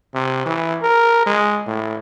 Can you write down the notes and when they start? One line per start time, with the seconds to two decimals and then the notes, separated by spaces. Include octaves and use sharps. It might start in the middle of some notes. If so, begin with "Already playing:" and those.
0.14 C3
0.45 E3
0.81 A#4
1.26 G#3
1.67 A2